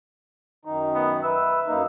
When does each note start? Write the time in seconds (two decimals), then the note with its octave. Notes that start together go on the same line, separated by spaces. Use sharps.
0.65 F#2 D#3 D#4
0.95 B3
1.23 B4 E5 E6
1.67 F#2 A#3 D#4